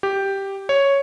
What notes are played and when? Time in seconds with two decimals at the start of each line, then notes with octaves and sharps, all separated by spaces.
0.03 G4
0.69 C#5